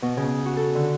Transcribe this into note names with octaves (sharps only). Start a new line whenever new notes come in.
B2
C#3
F#4
A4
D3